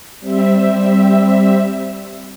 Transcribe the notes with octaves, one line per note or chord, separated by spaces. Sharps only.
G3 C4 E5